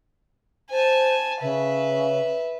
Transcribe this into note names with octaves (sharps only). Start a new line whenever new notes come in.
C5 G#5 A5
C#3 B4 E5